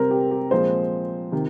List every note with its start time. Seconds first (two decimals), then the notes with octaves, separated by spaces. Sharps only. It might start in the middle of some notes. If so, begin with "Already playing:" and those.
Already playing: C3 G3 C4 A#4
0.11 G4
0.31 G4
0.51 A#2 F3 G#3 C4 C5
1.32 C3 D#3